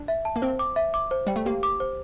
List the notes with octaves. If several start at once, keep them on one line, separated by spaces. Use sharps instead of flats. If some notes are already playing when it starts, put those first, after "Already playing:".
Already playing: D4
E5
A5
A#3
C4 C5
D6
E5
D6
C5
G3 G5
A3
A#3 G4
D6
C5